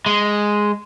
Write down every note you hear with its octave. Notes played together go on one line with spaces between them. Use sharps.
G#3